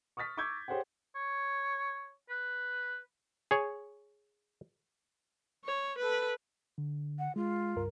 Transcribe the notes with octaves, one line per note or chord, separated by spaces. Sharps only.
C#6 D#6 F6 A6 B6
C#6 D6 E6 G6 G#6
G4 G#4 C5 C#5 F#5 G5
C#5
B4
G#4 C#5
C#5
A4 B4
D3
F#5
G#3 F4
C#2 G2 A#4